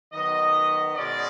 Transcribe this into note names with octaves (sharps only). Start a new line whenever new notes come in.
D#3 F#3 B3 D#5
B2 G#3 C#4 D5